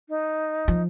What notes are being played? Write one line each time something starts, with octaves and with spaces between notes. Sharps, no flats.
D#4
F3